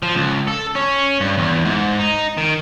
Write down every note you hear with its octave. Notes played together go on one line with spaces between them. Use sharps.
F3
C#2
A4
C#4
G2
E2
G#2
D#4
D#3